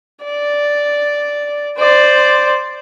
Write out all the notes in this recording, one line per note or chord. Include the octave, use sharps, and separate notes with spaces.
D5
C5 D5